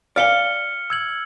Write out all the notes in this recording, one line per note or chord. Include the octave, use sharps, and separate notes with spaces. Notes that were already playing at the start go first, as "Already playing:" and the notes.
D5 F5 F6 C#7 G7
E6 G#6 F#7